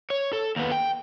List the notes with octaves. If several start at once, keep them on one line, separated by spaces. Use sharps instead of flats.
C#5
A4
D#2 B3
G5